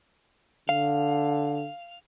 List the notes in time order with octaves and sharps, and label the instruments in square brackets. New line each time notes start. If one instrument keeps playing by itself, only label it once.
[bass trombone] D3 [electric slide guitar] F5